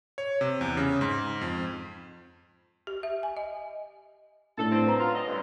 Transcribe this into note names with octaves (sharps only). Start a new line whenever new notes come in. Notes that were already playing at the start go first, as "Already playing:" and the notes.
C#5
C3
E2
C#3
G#2
F2
G4
E5
G#5
D#5
A2 D4 A4
G2 C4
B4 A#5
F#3 C#4 F4
C#4 D#5
G2 D3